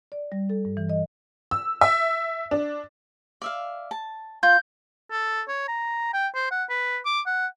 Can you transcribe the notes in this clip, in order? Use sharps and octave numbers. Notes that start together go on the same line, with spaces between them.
D5
G3
A4
G2
E3
D#5
E6
E5
D4
D5 E5 F5
A5
F4 G6
A4
C#5
A#5
G5
C5
F#5
B4
D6
F#5